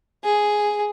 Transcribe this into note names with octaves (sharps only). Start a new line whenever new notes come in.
G#4